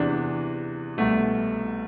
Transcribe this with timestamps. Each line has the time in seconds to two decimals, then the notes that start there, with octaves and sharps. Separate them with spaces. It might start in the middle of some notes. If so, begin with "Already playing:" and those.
Already playing: E2 C3 E3 D4
0.98 C2 B2 A3